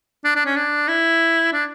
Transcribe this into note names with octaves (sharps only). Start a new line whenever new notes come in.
D4
D4
C#4
D4
E4
D4